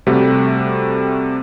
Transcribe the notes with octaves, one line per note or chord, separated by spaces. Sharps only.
C3 G3 A3 F#4